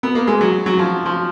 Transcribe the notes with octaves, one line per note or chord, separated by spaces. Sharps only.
B3
A#3
G#3
F#3
F#3
F3
F3